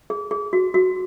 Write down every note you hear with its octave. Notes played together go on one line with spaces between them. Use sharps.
G#4
G#4
F#4
F#4